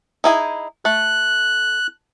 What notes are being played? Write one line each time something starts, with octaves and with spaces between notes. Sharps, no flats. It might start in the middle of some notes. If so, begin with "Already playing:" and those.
D#4 E4 G#4
A3 F#6